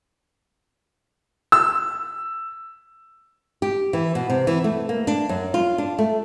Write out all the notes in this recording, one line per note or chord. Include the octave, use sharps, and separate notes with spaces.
E6
G4
E3
B2
C3
E3
A3
A#3
D4
F#2
F4
D4
A3